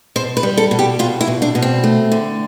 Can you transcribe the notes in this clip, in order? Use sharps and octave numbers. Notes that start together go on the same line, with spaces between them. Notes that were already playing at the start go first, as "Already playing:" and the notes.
B2 C5
B4
G3
A4
B2
G4
B2 F4
E4
B2
D4
B2
C4
A3
D3